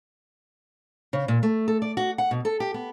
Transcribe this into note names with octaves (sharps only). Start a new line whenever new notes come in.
C#3
A#2
A3
A4
D5
F#4
F#5
B2
A4
G4
B3